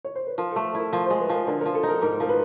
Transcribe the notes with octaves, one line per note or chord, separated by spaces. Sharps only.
C#5
C5
B4
F3 A#4
A3 A4
E4 A#4
F3 A#4
G#3 C5
B4
F3 A#4
D3 A#4
F3 A#4
A4
D#4
A#4
G#2 A#4
F3 A#4
B4